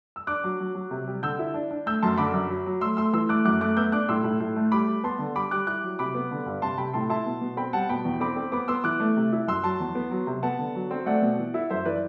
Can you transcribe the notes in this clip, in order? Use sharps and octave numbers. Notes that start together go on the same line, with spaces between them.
E6
D4 D6 F#6
F#3
F#3
F#3
C3
G3
D3 E6 G6
E4
D4
D4
A3 E6 G6
F#2 A5 C6
D3 B5 D6
F#2
F#3
F#3
A3 C6 E6
A3 C6 E6
E3 C6 E6
A3 D6 F#6
F#2 D6 F#6
A3 D6 F#6
B3 E6 G6
D4 D6 F#6
A2 C6 E6
A2
A2
A3
G3 B5 D6
G3
B3 A5 C6
D3
G3 B5 D6
G3 D6 F#6
E4 D6 F#6
F#3
C3 B5 D6
B3
D3
G2
C3 A5 C6
C3 G5 B5
A2 A5 C6
E4 A5 C6
B2
B2
C4 G5 B5
G3 F#5 A5
B2 G5 B5
E2
C4 B5 D6
C4
B3 B5 D6
B3 C6 E6
E3 D6 F#6
A3
C3
E4
F#2 C6 E6
F#3 A5 C6
E2
B3
F#3
C3
B3 F#5 A5
D3
F#3
C4
A3 D5 F#5
B2
E3
E4
F#2 C5 E5
E3 B4 D5